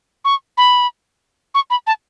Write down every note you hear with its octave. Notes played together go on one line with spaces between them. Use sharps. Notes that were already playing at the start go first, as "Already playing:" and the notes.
C#6
B5
C#6
B5
A5